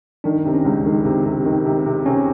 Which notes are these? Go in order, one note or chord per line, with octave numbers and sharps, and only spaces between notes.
D#3 D4
C3
C#4
C#2
D#3
C3
C3
D#3
C3
C3
C3 C#4